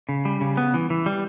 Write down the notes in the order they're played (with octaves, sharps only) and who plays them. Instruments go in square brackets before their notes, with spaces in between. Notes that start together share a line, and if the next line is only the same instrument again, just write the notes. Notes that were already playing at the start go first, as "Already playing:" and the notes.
[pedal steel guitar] C#3
G3
C#3
B3
E3
E3
G3